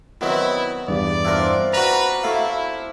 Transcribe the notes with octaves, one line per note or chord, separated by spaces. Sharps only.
D#3 F#3 B3 C4 E4
E2 G2 D5
C4 D4 E4 F4 A#4
F#4 B4 A#5
A3 E4 F5